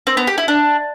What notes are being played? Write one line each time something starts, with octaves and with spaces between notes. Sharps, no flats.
C4
B3
G4
E4
D4